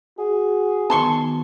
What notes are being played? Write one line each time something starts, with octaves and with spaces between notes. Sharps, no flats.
F#4 G#4
D#3 B3 A5 C6 C#6